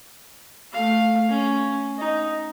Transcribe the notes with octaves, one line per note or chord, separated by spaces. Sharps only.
A3 F5
C#4
D#4